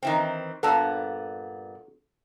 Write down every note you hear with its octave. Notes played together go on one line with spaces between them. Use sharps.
D#3 E3 C4
G2 A#2 B3 A4